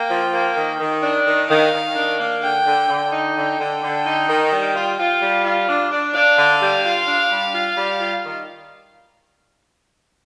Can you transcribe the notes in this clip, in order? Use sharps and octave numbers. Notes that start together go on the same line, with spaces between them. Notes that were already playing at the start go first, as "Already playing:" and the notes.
Already playing: A#3 G5
F3
A#3
D#3
D#3
D4
D#3
D#3 F5
D#3
D4
A#3
D3 G5
D3
D3
D#4
D3 G5
D3
D3
D#4
D#3
G3
F4
F4
G3
F4
D4
D4
D4 F5
D3
G3
F4
D4
G3
F4
G3
F4
D#3